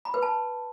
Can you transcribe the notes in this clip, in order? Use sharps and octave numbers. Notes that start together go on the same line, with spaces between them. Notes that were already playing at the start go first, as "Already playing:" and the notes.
B5
B4
A5